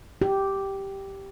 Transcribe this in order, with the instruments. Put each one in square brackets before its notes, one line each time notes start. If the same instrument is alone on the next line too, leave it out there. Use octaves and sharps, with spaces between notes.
[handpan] G4